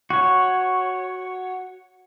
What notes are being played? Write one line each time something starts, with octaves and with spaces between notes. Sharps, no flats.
F#4 C#5